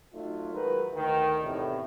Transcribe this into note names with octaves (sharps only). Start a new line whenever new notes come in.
F#3 A3 D#4 F4
D#3 F#3 G#3 D#4 A#4 B4
D2 D#3
E2 A2 C3